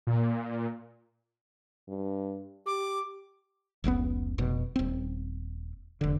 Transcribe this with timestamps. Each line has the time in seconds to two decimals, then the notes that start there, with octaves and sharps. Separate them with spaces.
0.07 A#2
1.89 G2
2.66 G4 D6
3.84 F1 C#2 A#2 B3
4.38 F1 B2
4.76 D#1 C4
6.01 E1 D3